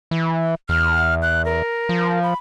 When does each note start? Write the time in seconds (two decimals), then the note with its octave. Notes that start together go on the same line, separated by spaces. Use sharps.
0.11 E3
0.69 E2 F6
1.22 F#6
1.45 A#4
1.89 F3
2.23 B5